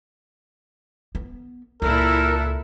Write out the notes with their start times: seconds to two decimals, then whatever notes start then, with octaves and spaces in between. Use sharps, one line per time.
1.15 B3
1.82 C#2 A#2 E4 A4 A#4 E6 F#6